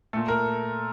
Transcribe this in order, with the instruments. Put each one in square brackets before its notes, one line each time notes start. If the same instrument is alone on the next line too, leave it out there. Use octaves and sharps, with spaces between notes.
[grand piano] A#2 A3 A4
A#4